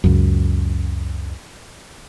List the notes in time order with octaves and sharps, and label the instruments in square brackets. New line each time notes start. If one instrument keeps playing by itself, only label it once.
[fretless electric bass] C#2 F#2